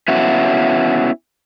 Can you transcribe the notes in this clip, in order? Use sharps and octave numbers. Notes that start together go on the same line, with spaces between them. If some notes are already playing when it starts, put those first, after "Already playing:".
B3 C#4 E4 F#4